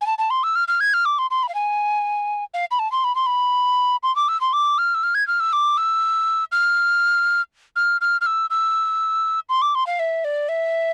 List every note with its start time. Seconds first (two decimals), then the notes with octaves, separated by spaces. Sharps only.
0.01 G#5
0.07 A5
0.18 A5
0.30 C6
0.43 E6
0.56 F6
0.68 F6
0.80 G#6
0.94 F6
1.05 D6
1.19 C6
1.31 C6
1.43 B5
1.49 F5
1.55 G#5
2.54 F5
2.71 B5
2.79 A5
2.92 C6
3.04 B5
3.16 C6
3.26 B5
4.03 C6
4.16 D6
4.28 E6
4.41 C6
4.53 D6
4.78 F6
4.95 E6
5.03 F6
5.15 G#6
5.28 F6
5.40 E6
5.53 D6
5.77 E6
6.52 F6
7.76 F6
8.01 F6
8.21 F6
8.26 E6
8.50 E6
9.49 C6
9.62 D6
9.75 C6
9.87 F5
9.99 E5
10.24 D5
10.49 E5